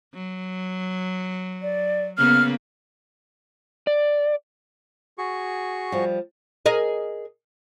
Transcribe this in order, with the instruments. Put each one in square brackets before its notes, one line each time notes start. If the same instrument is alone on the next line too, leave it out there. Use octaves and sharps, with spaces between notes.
[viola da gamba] F#3
[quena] D5
[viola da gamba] C#3 A#3 B3 [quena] F6
[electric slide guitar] D5
[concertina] F#4 G#4 C#6
[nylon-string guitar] F3 G3
[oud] G#4 A#4 D#5